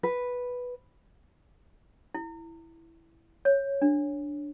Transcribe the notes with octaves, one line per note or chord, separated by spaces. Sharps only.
B4
E4
C#5
D4